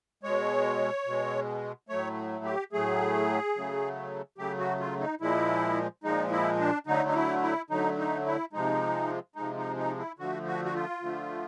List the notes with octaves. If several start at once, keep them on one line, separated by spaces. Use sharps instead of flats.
B2 G#3 C#5
B2 G#3
A2 F#3 A3 C#5
G4
A2 F#3 A3 G#4
C#3 F#3 A3
C#3 F#3 A3 G4
F#4
F4
D#4
A#2 F3 G#3 E4
A#2 F3 G#3 D#4
E4
D4
D3 F#3 A3 D#4
D#4
E4
E4
D3 F#3 A3 D#4
D#4
E4
C3 F3 G#3 D#4
C3 F3 G#3 D#4
D#4
D#4
E4
D3 F3 A3 F#4
F#4
F#4
F4
D3 F3 A3